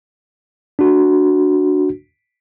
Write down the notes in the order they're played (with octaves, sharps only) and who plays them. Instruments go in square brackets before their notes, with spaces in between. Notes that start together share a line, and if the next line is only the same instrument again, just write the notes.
[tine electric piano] D4 F#4